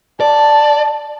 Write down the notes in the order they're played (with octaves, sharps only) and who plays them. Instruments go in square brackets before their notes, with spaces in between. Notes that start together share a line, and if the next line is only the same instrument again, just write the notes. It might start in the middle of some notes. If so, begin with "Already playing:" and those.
[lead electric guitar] D5 [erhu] A5